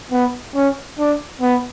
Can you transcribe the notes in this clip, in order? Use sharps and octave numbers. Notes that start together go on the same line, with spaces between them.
B3
C#4
D4
B3